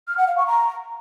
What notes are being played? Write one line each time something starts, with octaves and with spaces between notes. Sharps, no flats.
F6
F#5
F5
C#6
A#5